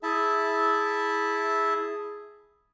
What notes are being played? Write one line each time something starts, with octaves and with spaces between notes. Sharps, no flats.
E4 G#4 E5 A5